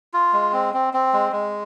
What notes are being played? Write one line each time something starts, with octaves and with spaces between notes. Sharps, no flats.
F4
G#3
C4
C4
C4
G#3
G#3